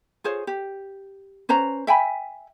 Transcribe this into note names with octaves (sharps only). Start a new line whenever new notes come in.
F4 G#4 C5 C#5
G4
C#4 B4 C5 A#5
E5 G5 G#5 B5